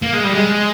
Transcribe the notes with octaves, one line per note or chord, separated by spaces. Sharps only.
A#3
G#3
G3
G#3